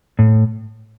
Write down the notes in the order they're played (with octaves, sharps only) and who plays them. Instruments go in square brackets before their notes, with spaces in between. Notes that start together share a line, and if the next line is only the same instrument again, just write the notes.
[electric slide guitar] A2